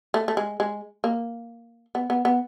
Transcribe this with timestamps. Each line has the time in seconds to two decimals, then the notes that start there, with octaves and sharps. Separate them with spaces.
0.14 A3
0.28 A3
0.37 G#3
0.60 G#3
1.04 A#3
1.95 B3
2.10 B3
2.25 B3